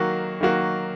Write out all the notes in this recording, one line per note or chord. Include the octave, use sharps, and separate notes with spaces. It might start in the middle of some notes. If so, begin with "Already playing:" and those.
Already playing: D#3 F#3 A#3 F#4
D#3 F#3 A#3 F#4